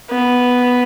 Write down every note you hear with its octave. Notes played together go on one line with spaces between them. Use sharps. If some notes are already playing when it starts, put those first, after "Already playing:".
B3